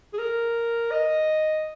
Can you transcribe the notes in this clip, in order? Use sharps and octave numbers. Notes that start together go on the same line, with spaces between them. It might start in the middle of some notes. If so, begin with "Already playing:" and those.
G#4
A#4
D#5